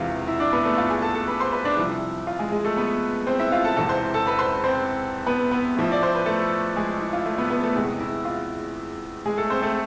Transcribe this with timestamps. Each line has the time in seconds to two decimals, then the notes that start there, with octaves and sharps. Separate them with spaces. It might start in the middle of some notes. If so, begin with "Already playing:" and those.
Already playing: E1 E2 C3 E3 F4 F5
0.27 E4 E5
0.40 D4 D5
0.53 B3 B4
0.65 A3 A4
0.78 F4 F5
0.90 G#4 G#5
1.02 A4 A5
1.15 A4 A5
1.27 B4 B5
1.40 C5 C6
1.52 B4 B5
1.64 D4 D5
1.77 C2 C3 F3 E4
2.27 F4
2.39 G#3 G#4
2.52 G#3 G#4
2.64 A3 A4
2.77 B3 B4
3.27 C4 C5
3.39 E4 E5
3.52 F4 F5
3.64 A4 A5
3.77 E1 E2 C3 E3 A4 A5
3.89 C5 C6
4.14 A4 A5
4.27 B4 B5
4.39 C5 C6
4.64 C4 C5
5.26 B3 B4
5.51 B3 B4
5.76 A1 A2 F3 E5
5.92 D5
6.03 C5
6.15 B4
6.26 A3 A4
6.76 G#3 G#4
7.01 E4
7.13 F4
7.25 A3 A4
7.38 B3 B4
7.50 B3 B4
7.63 A3 A4
7.75 E2 C3 E3 G#3 G#4
8.00 E4
8.25 F4
9.25 G#3 G#4
9.38 A3 A4
9.50 C4 C5
9.62 A3 A4